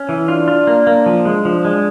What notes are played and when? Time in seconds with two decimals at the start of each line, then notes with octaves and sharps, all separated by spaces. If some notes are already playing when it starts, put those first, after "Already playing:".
Already playing: C#4
0.09 E3
0.28 D4 F4
0.48 F4
0.67 A#3
0.87 A#3
1.06 F3
1.25 G#3
1.45 F3 D4
1.65 G#3